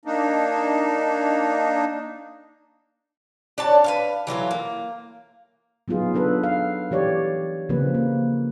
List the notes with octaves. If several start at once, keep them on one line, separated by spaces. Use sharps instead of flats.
A#3 D4 D#4
D4 C#5 A5
B4 C#5 F5
E3 F#3 F4 A4
A#3
F#3 B3 D#4 F4 G#4
B3 D4 A4 B4
F5
E3 G4 C#5 D5
C#3 F3 A#3 C4 B4
A#3